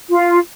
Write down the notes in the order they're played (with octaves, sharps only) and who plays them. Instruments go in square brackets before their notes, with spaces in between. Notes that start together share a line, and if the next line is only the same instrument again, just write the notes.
[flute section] F4